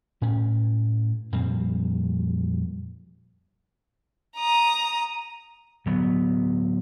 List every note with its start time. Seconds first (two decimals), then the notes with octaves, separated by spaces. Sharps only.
0.22 A2 C#4
1.32 F2 A#2 G3 C4
4.37 A#5 D#6
5.86 D1 F#3 B3